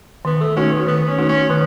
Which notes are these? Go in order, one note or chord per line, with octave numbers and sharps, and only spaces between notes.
D#3 B3
A3
A3 C#4 D#4 F#4
B3
D#3 B3
C#4
A3 D#4 F#4
C#4
D#3 B3